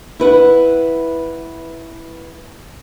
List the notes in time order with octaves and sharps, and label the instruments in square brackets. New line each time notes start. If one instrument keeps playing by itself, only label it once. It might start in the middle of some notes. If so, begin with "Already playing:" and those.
[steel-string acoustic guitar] E4 B4 F#5